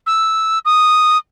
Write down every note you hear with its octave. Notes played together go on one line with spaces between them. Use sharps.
E6
D#6